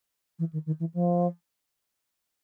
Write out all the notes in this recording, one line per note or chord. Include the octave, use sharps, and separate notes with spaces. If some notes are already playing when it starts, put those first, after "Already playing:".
E3
D#3
D#3
E3
F3